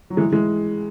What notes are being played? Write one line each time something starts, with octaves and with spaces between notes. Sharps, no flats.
F#3
E3 G#3
E3 G#3